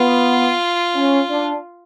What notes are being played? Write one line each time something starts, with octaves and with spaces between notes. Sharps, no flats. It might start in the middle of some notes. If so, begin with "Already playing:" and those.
Already playing: B3 F4
C#4
D4